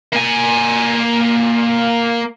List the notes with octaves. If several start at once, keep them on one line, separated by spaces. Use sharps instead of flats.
A#3 G#5